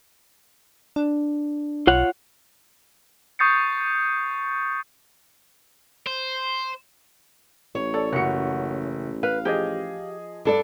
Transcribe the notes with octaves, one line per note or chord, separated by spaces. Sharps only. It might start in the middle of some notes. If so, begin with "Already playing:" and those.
D4
B1 F4 C#5 F#5
C#6 D#6 G6 A6 C7 C#7
C5
A1 C#5
A4 D5
F#1 F#4 F#5 C#7
B4 F5
F3 G4 G#4 D#5
G2 D4 A4 D5